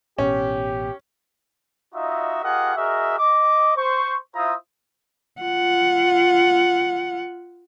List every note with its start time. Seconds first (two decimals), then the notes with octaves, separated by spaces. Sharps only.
0.18 A1 B2 C#4 G4
1.95 D#4 F4 F#4 D#5 E5
2.42 F4 G4 G#4 A#4 D#5 F#5
2.75 F#4 G#4 A#4 D#5 E5
3.18 D#5 D6
3.76 C5 C#6
4.35 E4 F4 C5 E5 A#5 D#6
5.41 F4 F#5